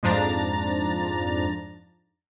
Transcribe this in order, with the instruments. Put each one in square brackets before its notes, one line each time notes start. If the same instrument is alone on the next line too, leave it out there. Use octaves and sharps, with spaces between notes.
[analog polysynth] F2 G#2 F3 D4 A#5 A6